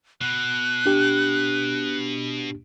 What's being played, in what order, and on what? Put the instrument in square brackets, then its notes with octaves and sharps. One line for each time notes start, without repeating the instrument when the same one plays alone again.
[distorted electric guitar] B2 [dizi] F#6
[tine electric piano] D4 G4